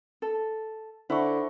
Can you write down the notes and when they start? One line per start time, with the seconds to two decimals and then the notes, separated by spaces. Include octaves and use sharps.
0.22 A4
1.10 D3 E4 C5 E5 C#6